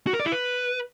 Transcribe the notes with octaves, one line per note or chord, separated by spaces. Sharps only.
F#4
A#4
D5
E4
B4